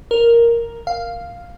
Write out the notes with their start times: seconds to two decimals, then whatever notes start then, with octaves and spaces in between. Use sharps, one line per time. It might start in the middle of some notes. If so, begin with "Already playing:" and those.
0.11 A#4
0.87 F5